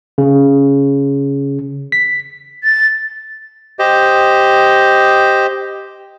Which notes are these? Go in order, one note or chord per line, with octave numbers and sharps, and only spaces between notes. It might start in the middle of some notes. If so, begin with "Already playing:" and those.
C#3
B6
A6
G4 C5 D#5